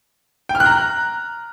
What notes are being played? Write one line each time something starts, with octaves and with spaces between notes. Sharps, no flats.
G5
F6
F#6
A#5